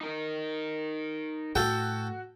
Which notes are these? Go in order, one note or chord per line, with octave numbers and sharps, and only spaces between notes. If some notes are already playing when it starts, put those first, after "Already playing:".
D#4 A#4
A2 F#4 A4 G5